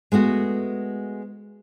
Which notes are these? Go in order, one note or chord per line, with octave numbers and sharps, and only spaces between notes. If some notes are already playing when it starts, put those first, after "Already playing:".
G#3 A3 B3 F#4